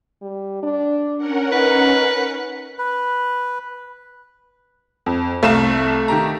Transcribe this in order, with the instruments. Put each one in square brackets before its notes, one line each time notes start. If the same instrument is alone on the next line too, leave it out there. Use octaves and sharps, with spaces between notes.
[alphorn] G3
D4
[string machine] C#4 A#4 F#5
[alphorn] D#4 [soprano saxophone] B4
[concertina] B4
[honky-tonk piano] F2
[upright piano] C2 F5 E7 [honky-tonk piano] A3
[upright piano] D#3 G4 A#5